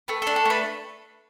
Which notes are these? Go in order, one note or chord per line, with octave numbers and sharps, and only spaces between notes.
A3 B4
D4 A4
A4
A3 B4